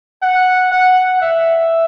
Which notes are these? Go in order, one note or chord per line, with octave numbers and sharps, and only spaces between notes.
F#5
F#5
E5